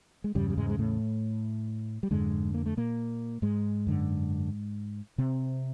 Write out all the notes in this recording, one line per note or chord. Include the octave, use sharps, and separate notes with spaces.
G#3
E2 G2 C#3 G3
G3
G#2 G#3
G#3
A2 A3
G3
F2 G#2 D3 G#3
A#3
A3
A#2 A#3
G#2 G#3
F#2 D3
C3 C4